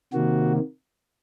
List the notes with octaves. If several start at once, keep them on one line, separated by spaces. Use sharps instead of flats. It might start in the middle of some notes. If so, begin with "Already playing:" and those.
C3 D#3 A#3 F#4